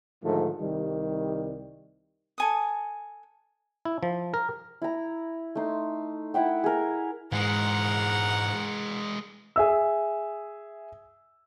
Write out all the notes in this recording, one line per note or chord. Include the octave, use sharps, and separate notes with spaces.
G#2 D3 D#3 F3 A3
C2 D#3 G3
A4 G#5 D#6
E4
F3
A#4
E4 A#5
A3 D#4 C6
E4 E5 F#5 G5
G#4 A#4
G#2 E3 G#3 A#4 F#5
G#4 E5 E6